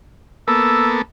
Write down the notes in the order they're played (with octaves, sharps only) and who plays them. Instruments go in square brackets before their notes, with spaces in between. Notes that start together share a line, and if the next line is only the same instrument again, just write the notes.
[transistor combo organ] A#3 B3 A4 [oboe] E6